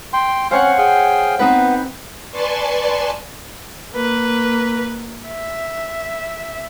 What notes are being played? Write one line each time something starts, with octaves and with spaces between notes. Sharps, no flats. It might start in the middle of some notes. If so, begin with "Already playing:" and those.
G5 C6
C4 C#4 C5 C#5 F5 F#5
G#4 F5 G5
B3 C4 D#4 B4
B4 D5 G#5 A5 C6 C#6
A#3 B4
E5